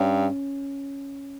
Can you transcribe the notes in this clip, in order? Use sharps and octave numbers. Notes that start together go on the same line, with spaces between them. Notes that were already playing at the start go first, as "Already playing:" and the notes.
Already playing: G2 C#4